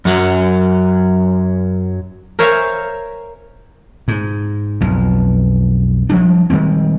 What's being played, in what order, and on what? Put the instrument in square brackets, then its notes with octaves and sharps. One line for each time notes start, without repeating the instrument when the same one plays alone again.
[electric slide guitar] F#2 F#3
[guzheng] A#4 C5 C#5 E5 F5 G#5
[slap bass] G#2
B1 F2
F3 G3 D4
D#3 G3 G#3 C4